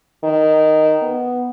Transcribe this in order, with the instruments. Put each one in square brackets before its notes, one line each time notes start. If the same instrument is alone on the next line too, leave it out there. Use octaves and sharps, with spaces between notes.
[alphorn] D#3
B3